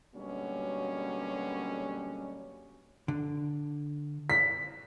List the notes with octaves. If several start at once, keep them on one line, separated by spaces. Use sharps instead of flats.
B2 D3 F#3 G3 A#3 C#4
D3
B6